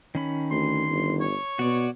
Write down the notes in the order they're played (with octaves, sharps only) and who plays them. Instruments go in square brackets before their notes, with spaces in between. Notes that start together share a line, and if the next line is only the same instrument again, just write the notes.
[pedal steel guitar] D#3 C#4 B5
[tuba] D2 [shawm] C6
[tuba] G1
[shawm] C#5
[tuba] B2 [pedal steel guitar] F#4 D5